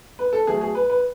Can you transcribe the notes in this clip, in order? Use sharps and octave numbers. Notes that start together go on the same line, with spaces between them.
B4
A4
B2 F#3 A3 G#4
G#4
B4
B4